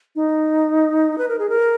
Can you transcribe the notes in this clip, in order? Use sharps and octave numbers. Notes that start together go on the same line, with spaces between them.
D#4
B4
A#4
G#4
A#4